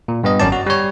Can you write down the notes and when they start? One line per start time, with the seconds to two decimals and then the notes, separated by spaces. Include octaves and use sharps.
0.08 A#2
0.24 G2 B3 D#5
0.40 G#1 F#2 C#4 D5 A5
0.52 F#4
0.66 G3 C#5